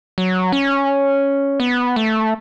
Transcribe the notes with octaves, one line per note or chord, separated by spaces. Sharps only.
F#3
C#4
B3
A3